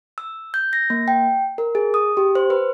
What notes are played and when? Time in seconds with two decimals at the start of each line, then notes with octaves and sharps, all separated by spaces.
0.18 E6
0.54 G6
0.73 A#6
0.90 A#3
1.08 G5
1.58 A#4
1.75 G#4
1.94 D#6
2.17 G4
2.35 C5
2.50 B4